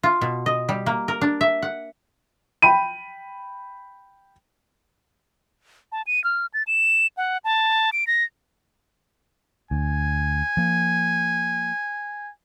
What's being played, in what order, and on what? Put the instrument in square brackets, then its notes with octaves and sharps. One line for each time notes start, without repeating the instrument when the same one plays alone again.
[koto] F4
B2
D#5
G3
A#3
A#4
D4
E5
F#5
[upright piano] G5 B5 D#7
[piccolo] A5
D#7
F6
A6
E7
F#5
A5
D7
A#6
[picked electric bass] D2 [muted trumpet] G#5
[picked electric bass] F3 A#3